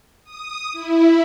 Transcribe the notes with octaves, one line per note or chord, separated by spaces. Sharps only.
D#6
E4